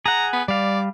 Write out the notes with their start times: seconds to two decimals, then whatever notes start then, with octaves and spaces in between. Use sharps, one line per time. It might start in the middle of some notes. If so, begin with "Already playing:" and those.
0.06 G#4 F#5 A#5
0.33 B3
0.48 G3 D5 F5